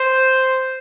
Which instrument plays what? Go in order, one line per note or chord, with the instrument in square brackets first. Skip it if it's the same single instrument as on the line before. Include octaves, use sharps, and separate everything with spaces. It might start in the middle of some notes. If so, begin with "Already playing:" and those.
Already playing: [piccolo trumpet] C5